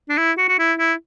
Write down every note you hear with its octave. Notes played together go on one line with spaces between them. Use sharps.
D4
E4
F#4
F#4
E4
E4